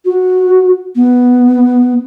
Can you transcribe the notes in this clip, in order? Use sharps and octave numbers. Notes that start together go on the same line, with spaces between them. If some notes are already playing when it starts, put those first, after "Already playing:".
F#4
B3